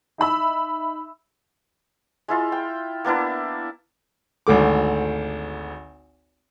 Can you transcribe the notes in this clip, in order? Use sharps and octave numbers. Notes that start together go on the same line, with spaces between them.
D#4 E5 B5 E6
G#3 E4 F4
G5
A#3 B3 D4 E4
G#1 D2 A3 D6